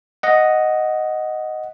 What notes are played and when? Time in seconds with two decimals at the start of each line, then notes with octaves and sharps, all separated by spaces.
0.23 D#5 F#5